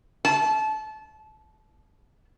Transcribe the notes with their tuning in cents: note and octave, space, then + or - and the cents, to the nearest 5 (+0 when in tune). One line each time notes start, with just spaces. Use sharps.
A5 -25